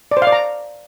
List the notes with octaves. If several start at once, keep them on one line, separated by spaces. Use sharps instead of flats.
D5
C5
F5
D5
A#5